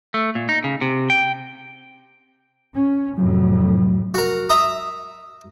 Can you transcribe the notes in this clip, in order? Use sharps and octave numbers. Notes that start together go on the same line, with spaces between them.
A3
A#2
D#4
C#3
C3
G5
C#4
C2 F2 A2 F#3
F#4 A#4
E5 A#5 D#6